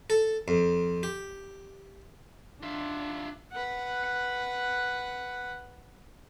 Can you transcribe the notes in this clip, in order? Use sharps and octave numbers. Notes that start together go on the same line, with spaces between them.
A4
F2
G4
D4 F4 E5
B4 F#5